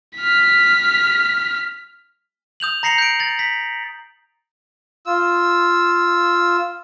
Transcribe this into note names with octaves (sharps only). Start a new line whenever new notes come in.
F6 B6
D#6 G6 F7 F#7
A#5 A#6 C7 C#7 F7 F#7
G6 D7
A6 F#7
B6
F4 E6